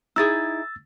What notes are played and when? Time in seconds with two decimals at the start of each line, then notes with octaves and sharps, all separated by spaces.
0.16 D#4 E4 G#4 E6 A6